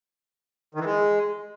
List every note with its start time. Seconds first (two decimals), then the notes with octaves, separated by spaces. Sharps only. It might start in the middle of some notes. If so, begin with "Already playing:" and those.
0.75 D#3
0.80 E3
0.86 G#3